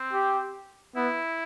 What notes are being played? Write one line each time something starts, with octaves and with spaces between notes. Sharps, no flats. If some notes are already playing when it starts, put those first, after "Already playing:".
Already playing: C4
G4
B3 E4